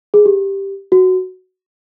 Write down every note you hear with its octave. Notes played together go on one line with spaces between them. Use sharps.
G#4
G4
F#4